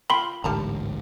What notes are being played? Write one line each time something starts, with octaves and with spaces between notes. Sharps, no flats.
F4 G5 B5 C6
A1 D2 G#2 G3 A5 A#5